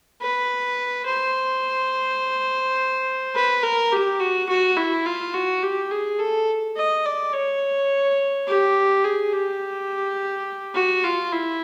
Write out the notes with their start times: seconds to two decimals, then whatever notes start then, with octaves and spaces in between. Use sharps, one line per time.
0.21 B4
1.06 C5
3.35 B4
3.63 A#4
3.92 G4
4.20 F#4
4.49 F#4
4.77 E4
5.06 F4
5.34 F#4
5.63 G4
5.91 G#4
6.19 A4
6.76 D#5
7.06 D5
7.34 C#5
8.48 G4
9.04 G#4
9.33 G4
10.75 F#4
11.04 F4
11.32 E4